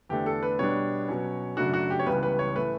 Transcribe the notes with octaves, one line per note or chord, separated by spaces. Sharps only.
E2 D3 A3 D4 G4
A4
B4
B2 G3 B3 D4 C#5
B2 F#3 C#4
F#2 C#3 F#3 A3 D4 F#4
F#4
G4
C#5
C#2 C#3 E3 G3 B3 B4
B4
C#5
A2 E3 A3 B4